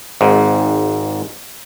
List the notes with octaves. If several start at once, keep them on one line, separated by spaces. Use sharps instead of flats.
G#1 G#2